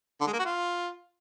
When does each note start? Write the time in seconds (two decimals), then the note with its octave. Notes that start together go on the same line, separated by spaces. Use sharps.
0.21 D3
0.27 G#3
0.33 A#3
0.39 F#4
0.45 F4